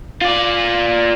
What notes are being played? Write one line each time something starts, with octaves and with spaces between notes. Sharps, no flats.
F4 D5